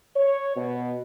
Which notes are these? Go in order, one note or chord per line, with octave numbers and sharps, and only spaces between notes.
C#5
B2